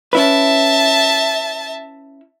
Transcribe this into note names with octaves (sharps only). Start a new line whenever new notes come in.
C#4 E4 B4 E5 A5